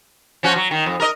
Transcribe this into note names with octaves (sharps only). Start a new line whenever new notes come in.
F3 C#4 F#4
F#3
D#3
F2
A#4 D#5